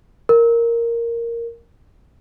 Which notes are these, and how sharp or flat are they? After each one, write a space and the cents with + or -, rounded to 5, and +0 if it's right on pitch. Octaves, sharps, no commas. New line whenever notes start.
A#4 -5